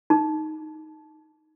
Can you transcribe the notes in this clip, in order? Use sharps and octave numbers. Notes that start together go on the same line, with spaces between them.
D#4